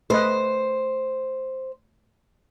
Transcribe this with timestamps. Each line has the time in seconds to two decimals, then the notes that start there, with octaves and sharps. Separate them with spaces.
0.10 A3 B4 C5 D#5